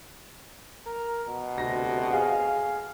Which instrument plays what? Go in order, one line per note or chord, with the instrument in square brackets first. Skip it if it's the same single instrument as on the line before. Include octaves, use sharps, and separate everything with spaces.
[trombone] A#4
B2
[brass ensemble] D2 C3 [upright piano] A#6
[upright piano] G#4 [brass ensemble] F5